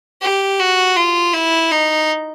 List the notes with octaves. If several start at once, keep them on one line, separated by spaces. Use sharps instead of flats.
G4
F#4
F4
E4
D#4